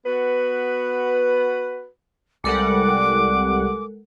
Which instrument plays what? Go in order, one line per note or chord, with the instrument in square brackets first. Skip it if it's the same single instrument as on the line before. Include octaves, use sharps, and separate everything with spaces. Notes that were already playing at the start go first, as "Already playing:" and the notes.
[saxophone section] B3 F#4 B4
[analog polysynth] C2 G3 F#5 [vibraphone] G#3 A4 A#4 [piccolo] D6